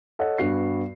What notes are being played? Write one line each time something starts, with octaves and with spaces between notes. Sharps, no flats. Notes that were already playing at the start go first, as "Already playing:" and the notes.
A4 C#5 D#5 F#5
G2 B3 F#4 C7